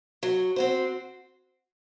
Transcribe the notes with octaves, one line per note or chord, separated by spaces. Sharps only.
F#3
C4 F#4 C5